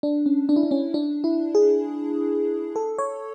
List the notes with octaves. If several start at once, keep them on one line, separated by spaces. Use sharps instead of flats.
D4
C#4
D4
E4
D4
C#4
D4
E4
G#4
A4
C#5